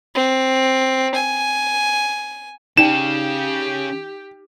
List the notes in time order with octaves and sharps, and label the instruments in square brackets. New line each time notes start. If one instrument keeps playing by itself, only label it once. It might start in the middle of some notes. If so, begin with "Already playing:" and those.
[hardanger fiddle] C4
G#5
[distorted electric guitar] C#3 [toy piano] D#4 D5 G5 [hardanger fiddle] G4 [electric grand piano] E7